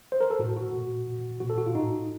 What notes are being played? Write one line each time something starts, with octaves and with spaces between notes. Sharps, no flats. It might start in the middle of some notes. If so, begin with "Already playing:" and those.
C5
A#4
A4
A2 F#4
F#4
A#2
A#2
A#2 F#4
A4
F#4
F4
A2 D#4